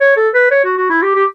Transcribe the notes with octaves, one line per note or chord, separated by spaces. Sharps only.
C#5
A4
B4
C#5
F#4
F#4
E4
G4
G4